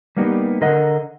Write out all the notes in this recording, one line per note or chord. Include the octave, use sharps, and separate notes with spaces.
G3 A#3 B3 D#4 G4
D3 A#4 D#5 F#5